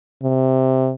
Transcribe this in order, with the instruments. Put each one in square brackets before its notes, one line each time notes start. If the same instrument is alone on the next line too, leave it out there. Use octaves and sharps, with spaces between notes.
[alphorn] C3